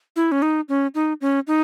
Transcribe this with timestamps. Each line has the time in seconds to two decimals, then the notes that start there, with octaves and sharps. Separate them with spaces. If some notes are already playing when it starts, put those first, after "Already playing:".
0.16 E4
0.32 C#4
0.42 D#4
0.69 C#4
0.95 D#4
1.21 C#4
1.47 D#4